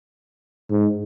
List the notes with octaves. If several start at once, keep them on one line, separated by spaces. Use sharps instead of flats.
G#2